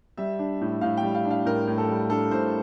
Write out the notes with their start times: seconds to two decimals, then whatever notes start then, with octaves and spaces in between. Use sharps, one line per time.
0.17 G3 E5
0.39 D4
0.61 A2
0.81 A2 F5
0.97 G5
1.03 G3
1.15 F5
1.25 D4
1.31 F5
1.45 A2 A#4
1.67 A2
1.78 A4
1.88 G3
2.10 D4 A4
2.31 A2 C5